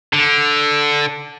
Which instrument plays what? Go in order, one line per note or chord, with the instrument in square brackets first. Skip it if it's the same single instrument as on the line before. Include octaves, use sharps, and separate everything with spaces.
[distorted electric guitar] D3